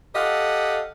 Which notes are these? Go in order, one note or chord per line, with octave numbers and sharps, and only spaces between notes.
G4 A4 D#5 F5 F#5